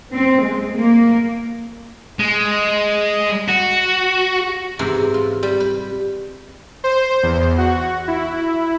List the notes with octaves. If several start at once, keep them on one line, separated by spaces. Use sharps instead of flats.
C4
G#3
A#3
G#3
F#4
G#2 C3 E3
F4
G3
B4
C5
E2
F#4
E4